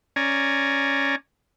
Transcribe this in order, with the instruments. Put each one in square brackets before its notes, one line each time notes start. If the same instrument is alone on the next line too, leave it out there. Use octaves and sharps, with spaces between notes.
[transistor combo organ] C#4 D5 G#5 A#5